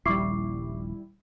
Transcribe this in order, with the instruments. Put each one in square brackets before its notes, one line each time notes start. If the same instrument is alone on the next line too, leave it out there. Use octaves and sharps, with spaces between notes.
[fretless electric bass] D#1 A#1 [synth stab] G3 E4 [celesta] C#6 D6 C7